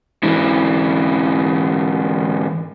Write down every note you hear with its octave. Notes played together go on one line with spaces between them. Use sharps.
G#2 E3